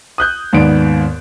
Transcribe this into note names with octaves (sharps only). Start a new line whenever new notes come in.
D#6 F#6 G6
D#2 G#2 B3 D5 D7